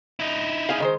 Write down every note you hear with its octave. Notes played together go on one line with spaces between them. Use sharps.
D#4 E4
G#4 F5
D#3 G#3 C5